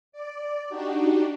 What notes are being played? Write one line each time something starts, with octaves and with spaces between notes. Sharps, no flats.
D5
D4 D#4 F#4 G4